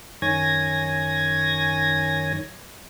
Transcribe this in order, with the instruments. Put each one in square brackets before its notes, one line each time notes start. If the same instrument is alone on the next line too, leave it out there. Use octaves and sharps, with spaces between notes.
[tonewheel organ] F#2 D#3 C#5 G#5 G#6 A#6